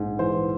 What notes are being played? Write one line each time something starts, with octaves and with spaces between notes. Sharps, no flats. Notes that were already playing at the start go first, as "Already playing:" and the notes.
Already playing: A#1 G#2
E3 C5